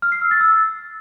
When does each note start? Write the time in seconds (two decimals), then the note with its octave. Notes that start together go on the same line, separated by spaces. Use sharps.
0.02 F6
0.12 C7
0.22 E6
0.31 A6
0.41 E6